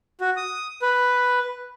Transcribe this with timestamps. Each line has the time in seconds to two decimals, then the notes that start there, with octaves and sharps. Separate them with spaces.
0.21 F#4
0.37 D#6
0.82 B4